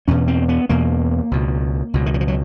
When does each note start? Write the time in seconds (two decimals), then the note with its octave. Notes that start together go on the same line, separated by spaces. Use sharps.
0.08 E2 B2 C#4
0.28 C4
0.49 B3
0.69 E2 B2 A#3
1.31 C#2 B2
1.94 C#2 B2
2.06 D#3
2.14 E3
2.21 F3
2.28 F#3